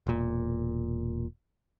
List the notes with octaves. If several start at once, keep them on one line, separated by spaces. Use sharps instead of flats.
E1 A#2